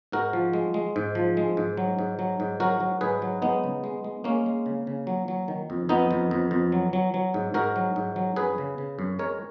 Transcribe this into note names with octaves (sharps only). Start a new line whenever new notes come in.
G#2 F#4 A#4
F3
G#3
G#3
G#2
F3
G#3
G#2
F#3
G#2
F#3
G#2
F#3 F#4 A#4
F#3
G#2 G#4 B4
F#3
G#3 B3 D#4
C#3
G#3
G#3
G#3 A#3 C#4
G#3
C#3
C#3
F#3
F#3
D#3
F2
F2 B3 D#4
F2
F2
F2
F#3
F#3
F#3
G#2
G#2 F#4 A#4
F#3
G#2
F#3
F#2 G#4 B4
C#3
C#3
F#2
G#3 A#4 C#5